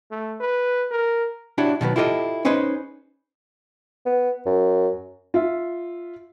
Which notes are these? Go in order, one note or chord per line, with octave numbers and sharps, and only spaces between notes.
A3
B4
A#4
D4 E4 F#4 G4 C#5 D5
B2 D#3 F#3 B4
E4 F4 G4 A4 C5 D#5
C#4 D#4 G#4 B4 C5 D#5
B3
F#2
F4 E5